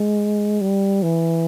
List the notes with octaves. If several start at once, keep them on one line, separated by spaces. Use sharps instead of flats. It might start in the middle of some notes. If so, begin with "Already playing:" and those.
Already playing: G#3
G3
E3